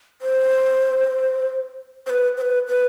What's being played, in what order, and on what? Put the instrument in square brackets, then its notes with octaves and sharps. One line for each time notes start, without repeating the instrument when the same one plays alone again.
[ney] C5
C5
B4
C5
B4
B4